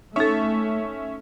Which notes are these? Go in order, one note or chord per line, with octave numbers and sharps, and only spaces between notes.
A3 C#4 D#4 A4 E5 C#6